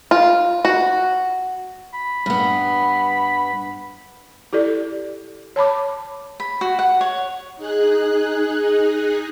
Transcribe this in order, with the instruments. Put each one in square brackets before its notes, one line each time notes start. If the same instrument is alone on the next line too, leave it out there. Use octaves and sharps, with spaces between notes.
[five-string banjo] F4
F#4
[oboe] B5
[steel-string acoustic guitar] G2 B3 [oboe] B5
[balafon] E4 G4 A4 D5
C#5 A5 B5 D6
[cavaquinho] B5
F#4
F#5
C#5
[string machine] D#4 G#4 F#6